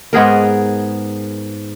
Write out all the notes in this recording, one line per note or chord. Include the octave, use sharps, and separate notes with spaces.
G#2 B3 G#4 A#4